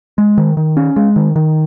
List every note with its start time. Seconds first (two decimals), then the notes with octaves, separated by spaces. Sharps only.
0.18 G#3
0.38 D#3
0.57 D#3
0.77 C#4
0.96 G#3
1.16 D#3
1.36 D#3